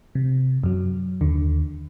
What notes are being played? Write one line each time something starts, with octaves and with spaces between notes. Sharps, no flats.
C3
F#2 F#3
D#2 D3